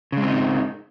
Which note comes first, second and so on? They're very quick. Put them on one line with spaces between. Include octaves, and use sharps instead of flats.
C#3 G#3 C4 D#4